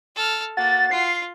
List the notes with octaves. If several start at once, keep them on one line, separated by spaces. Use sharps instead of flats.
A4 F6
A#3 F#4 A6
F4 C7